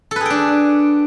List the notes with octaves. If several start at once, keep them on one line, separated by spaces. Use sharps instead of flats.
D4 G#4 A4 B4 G5